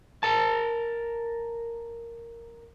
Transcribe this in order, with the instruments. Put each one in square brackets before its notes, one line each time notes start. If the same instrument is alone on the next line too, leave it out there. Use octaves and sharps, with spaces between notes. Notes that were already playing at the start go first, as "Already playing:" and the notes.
[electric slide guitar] A#4 A5